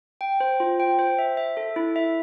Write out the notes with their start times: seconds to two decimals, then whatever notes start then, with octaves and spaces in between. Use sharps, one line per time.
0.21 G5
0.40 C5
0.60 F4
0.80 G5
0.99 C5
1.19 E5
1.37 E5
1.57 A4
1.76 E4
1.96 E5